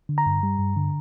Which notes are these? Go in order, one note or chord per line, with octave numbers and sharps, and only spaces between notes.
D3
A#5
G2
G3
G2
D3